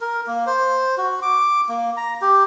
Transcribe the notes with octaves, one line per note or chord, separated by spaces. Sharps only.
A#4
A#3
C5
F#4
D6
A#3
A#5
G4